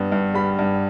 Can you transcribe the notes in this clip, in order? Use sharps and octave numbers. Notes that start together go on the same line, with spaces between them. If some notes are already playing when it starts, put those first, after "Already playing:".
Already playing: G2 G3 B3
G2
G3 B5
G2